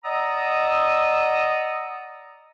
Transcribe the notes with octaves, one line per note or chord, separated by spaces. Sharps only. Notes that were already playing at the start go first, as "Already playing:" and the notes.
D5 D#5 F#5 A#5 D#6 E6